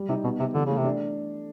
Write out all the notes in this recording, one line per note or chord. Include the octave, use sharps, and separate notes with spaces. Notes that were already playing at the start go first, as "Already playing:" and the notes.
Already playing: G3
C3 D#4
B2 B3
C3 G4
D3 E3
C#3 A3
C3
D4